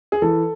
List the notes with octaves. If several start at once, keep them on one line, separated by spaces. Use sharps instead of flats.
G#4
E3 A4